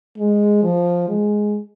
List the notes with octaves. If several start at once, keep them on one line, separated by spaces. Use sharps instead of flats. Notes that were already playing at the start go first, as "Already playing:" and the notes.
G#3
F3
G#3